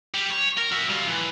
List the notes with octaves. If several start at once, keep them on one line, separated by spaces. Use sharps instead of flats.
G3
C#5
A#4
F#4 E5
G3 F4
A2 E3